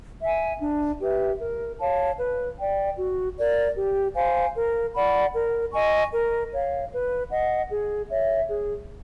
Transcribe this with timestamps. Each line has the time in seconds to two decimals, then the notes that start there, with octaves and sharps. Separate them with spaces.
0.22 E5 G#5
0.60 D4
1.00 G4 B4 E5
1.40 A#4
1.80 C#5 F5 A5
2.18 B4
2.59 D5 G5
2.98 F#4
3.37 A#4 D5
3.76 G4
4.15 C5 F5 G#5
4.55 A#4
4.95 D5 F#5 B5
5.34 A#4
5.73 D#5 G#5 C#6
6.12 A#4
6.52 C#5 F5
6.92 B4
7.30 D#5 F#5
7.70 G#4
8.09 C#5 E5
8.49 G#4